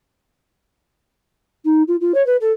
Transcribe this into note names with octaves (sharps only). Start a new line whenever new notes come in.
D#4
F4
F4
C#5
B4
A4